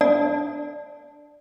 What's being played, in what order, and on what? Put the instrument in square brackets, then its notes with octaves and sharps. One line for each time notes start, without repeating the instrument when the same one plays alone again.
[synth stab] D4 [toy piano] D5